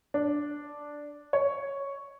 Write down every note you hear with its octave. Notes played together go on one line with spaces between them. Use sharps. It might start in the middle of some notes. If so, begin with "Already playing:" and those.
D4
C#5